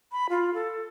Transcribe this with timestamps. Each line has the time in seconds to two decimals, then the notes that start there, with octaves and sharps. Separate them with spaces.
0.12 B5
0.29 F4
0.54 A4